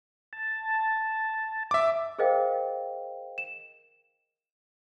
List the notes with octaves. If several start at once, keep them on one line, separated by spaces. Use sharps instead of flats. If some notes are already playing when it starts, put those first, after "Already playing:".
A5
E5 D6
G#4 A#4 C5 D#5 F5 G5
E7